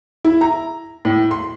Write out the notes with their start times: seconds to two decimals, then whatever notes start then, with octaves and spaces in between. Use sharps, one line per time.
0.25 E4
0.41 A#5
1.05 A2
1.31 C6